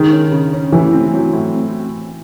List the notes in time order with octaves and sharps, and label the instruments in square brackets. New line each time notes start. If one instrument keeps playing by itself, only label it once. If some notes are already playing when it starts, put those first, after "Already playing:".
Already playing: [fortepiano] D#3 [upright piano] G#3
[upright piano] C#4
C#3
C#4
[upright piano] A2 [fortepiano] E3
[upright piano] C4
F#3
A2
C4